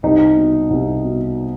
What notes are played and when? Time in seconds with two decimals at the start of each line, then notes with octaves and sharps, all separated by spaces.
0.03 C2 D#4
0.37 B2
0.70 C2
1.04 B2